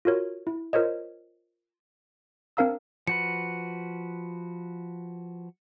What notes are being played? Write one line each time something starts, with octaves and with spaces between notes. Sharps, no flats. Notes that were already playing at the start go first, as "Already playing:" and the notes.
F4 F#4 A#4 C#5
E4
F4 A#4 C5 C#5 D#5
C4 D4 A#4 F5 A#5 E6
F3 F#4 B4 C#7